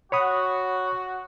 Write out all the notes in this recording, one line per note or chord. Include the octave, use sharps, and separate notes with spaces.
F#4 C#5 B5 D#6